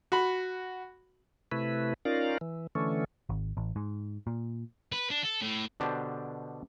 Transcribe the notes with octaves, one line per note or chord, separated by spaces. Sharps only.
F#4 B5
C3 A3 E4 B4
C#4 D#4 F4 A#4 D5 F5
E3
D3 E3 A3 C#4
G#1
A1
G#2
A#2
B4
D4
A4
A2
B2 D3 D4 G4 C5 A5